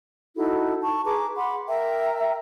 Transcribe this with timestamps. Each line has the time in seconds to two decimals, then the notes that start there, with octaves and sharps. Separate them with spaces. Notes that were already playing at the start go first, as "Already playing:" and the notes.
0.36 D#4 E4 F#4 A4
0.81 A5 C#6
1.05 G#4 B4 A#5 D6
1.37 F#5 B5 C6 D6
1.68 A#4 E5 G5 A#5